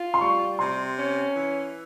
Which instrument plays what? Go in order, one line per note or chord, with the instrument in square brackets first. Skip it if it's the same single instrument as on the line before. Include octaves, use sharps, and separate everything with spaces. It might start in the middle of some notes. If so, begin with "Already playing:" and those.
Already playing: [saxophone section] F4
[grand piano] C6
[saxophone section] G3 [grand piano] C#6
[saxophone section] C3 [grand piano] C6
[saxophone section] C#4
E3